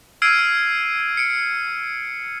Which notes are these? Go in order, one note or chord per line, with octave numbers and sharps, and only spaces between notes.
E6 F6 G#6 C7 D7 D#7
C#7 D7